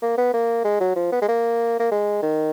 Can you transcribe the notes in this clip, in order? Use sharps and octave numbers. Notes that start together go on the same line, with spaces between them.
A#3
B3
A#3
G#3
F#3
F3
B3
G#3
A#3
A#3
G#3
D#3